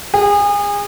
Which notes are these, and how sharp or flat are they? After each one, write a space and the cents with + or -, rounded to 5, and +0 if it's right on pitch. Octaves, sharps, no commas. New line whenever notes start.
G#4 -30